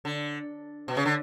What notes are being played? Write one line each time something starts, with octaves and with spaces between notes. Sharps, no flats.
D3
B2
C#3
D3